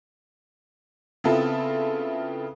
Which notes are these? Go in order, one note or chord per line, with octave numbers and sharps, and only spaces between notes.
C#3 B3 C4 E4 F4 A4